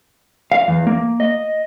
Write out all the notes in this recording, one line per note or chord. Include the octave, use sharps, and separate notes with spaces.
F5
E2
A#3
D#5